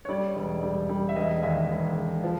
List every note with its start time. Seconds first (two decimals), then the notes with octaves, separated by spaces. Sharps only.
0.05 C#5
0.09 G3 D5
0.35 E1
0.63 G3
0.89 G3
1.09 E5
1.16 E1 D#5
1.43 D#2 E5
1.70 E1
1.97 E1
2.24 F3